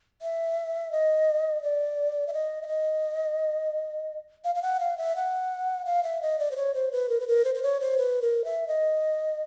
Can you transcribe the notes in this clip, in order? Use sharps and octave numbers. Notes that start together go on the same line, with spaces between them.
E5
D#5
D5
E5
D#5
E5
D#5
F5
F5
F#5
F5
E5
F#5
F5
E5
D#5
D5
C5
C#5
C5
B4
A#4
B4
A#4
C5
C5
C#5
C5
B4
A#4
E5
D#5